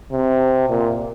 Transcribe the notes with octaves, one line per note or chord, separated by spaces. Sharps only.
C3
A#2